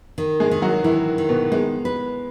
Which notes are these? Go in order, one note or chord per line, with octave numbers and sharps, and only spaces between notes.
D#3
G#3 G#4
D#3
F#3 F#4
D#3 E3 E4
D#3
B2 B3
G#3 B3
B4